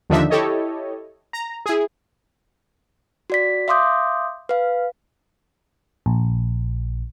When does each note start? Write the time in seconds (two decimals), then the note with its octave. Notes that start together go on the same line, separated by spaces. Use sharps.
0.10 D#2 D3 F3 D4 D#4 E5
0.30 E4 G4 A4 C#5 D#5
1.33 A#5
1.66 E4 G#4
3.30 F#4 D5 B6
3.68 E5 F5 C6 D6 D#6 G6
4.49 B4 F5
6.06 A#1